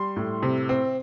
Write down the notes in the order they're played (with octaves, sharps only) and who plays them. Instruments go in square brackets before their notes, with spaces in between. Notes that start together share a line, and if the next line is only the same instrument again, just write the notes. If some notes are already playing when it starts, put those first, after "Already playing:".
Already playing: [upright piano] G3 C6
A2
C3
C4